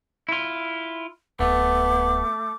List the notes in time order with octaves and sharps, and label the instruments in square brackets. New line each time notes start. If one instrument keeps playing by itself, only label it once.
[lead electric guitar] E4 F4
[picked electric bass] D1 [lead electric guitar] A3 [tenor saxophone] B3 [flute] D6